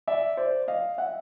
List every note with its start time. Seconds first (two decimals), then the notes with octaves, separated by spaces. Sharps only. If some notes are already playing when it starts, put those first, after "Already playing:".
0.07 D5 E5
0.37 C5 D5
0.68 D#5 F5
0.98 E5 F#5